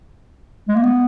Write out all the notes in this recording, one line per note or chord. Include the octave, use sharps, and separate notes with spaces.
G#3
A#3
B3